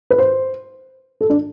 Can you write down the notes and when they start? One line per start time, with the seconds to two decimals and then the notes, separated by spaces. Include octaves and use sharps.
0.10 B4
0.18 C5
1.21 A4
1.30 D4